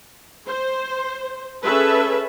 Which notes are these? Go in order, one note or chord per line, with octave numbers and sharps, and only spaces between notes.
C5
C#4 G#4 A4 B4 E5